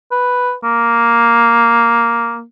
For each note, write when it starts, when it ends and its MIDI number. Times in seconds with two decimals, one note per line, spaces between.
0.11 0.54 71
0.63 2.43 58